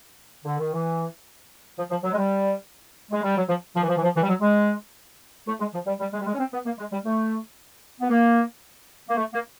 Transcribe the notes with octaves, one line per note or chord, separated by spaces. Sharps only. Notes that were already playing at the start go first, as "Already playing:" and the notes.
D3
D#3
E3
F3
F3
F#3
G#3
G3
G#3
G3
F#3
F3
F3
E3
F3
E3
F3
E3
G3
F#3
G#3
A3
G#3
F3
G3
G3
G#3
G3
G#3
C#4
C4
B3
A#3
G#3
G3
A3
B3
A#3
A#3
A3
A#3